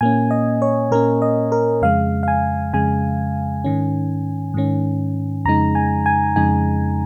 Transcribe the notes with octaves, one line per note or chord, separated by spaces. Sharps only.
A#2 A#3 C#4 G#5
D#5
C#5
A#2 A#3 C#4 A#4
D#5
A#4
F2 C#3 G#3 F5
F5
G#5
F2 C#3 G#3 G#5
G#2 D#3 C#4
G#2 D#3 C#4
F2 C#3 G#3 D#4 A#5
G#5
G#5
F2 C#3 G#3 D#4 G#5